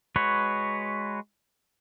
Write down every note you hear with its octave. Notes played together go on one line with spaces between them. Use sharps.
G#3 F#4 B4 C#5